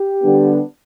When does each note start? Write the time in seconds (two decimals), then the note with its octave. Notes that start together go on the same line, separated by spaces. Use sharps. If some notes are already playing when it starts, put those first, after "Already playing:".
Already playing: G4
0.22 D3 G3 B3 D4